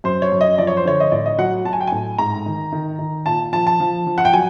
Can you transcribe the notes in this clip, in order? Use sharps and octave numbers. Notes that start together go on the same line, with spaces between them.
F#2 C5
C#5
F#2
D#5
F3 D5
C#5
C5
D3 C#5
D#5
A2 D5
D#5
F#3 F#5
F#3 A5
G#5
G5
A2 G#5
G#2 A#5
D#3
D#3
D#3
A#2 A5
F3 A5
A5
F3
F3
F#5
G5
F#3 G#5